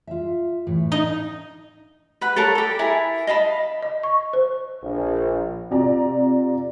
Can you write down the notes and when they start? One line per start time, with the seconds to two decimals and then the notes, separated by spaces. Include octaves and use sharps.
0.07 F4 E5
0.67 A2 E3
0.92 D#4
2.21 B4 F#5 B5
2.36 A4 A#4 C#5 A5
2.55 G4 A4
2.79 E4 A#4 G#5 A5
3.27 D#5 F5 A5 B5
3.82 D#5
4.03 C#6
4.33 C5
4.83 A#1
5.71 C3 F4 D5 A#5